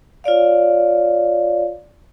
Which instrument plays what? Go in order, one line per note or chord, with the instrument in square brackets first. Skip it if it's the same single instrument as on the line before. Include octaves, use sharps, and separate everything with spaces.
[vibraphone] F4 C#5 D5 F5